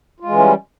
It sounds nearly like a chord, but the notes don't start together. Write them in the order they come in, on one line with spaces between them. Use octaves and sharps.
F4 G#3 E3 C#4 G3